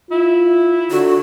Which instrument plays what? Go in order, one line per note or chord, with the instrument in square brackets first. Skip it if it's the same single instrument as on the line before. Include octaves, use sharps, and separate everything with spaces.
[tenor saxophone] E4 [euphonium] F4
[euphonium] D3 [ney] F#4